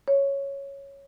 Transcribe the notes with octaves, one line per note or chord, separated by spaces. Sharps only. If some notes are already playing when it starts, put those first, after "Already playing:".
C#5